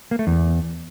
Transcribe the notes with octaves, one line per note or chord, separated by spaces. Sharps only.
A#3
A3
E2